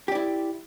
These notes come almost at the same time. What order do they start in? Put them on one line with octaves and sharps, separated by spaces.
G4 D5 E4